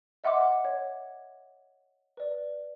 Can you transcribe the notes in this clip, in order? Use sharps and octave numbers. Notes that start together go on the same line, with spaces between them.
D#5 E5 F#5 C6 D6
C#5
B4 D5